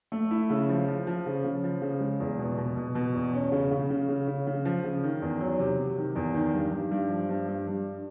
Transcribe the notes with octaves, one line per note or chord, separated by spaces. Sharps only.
A3
E4
C#3
F3
F3
F3
C#3
C#3
F3
C#3
G#3
E2
B2
B2
B2
B2
E2
C#4
C#3
C#3
C#3
C#3
C#3
C#3
F3
C#3
D#3
E2
F#3
C3
C3
D#3
E2
D#3
G2
G2
G2
F3
G2
G2
G2